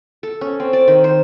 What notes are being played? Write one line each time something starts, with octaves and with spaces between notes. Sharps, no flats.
A4
C#4
C4
D5
D#3
C5